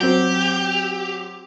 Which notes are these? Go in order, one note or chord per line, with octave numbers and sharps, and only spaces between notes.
F#3 C4 G4